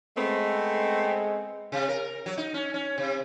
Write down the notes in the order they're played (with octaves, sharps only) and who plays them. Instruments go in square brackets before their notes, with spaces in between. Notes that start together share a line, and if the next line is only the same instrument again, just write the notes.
[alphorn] G#3 [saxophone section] A3 B3 C4
[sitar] C3
A#4
F#3
D#4
C#4
C#4
C3